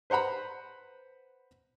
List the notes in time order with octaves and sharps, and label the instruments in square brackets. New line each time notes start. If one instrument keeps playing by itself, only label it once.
[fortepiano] B4 C5 F#5 A#5 B5